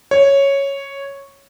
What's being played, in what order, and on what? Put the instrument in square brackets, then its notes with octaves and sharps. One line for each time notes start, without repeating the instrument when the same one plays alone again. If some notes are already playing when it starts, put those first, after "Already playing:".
[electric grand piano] C#5